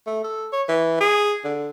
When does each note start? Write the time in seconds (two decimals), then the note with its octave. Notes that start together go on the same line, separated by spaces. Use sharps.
0.07 A3
0.24 A4
0.53 C#5
0.69 E3
1.01 G#4
1.44 D3